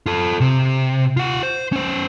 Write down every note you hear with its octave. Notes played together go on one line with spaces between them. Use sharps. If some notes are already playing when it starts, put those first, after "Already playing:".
F4 A4
C3
F4 F#5
C5
C#4 C5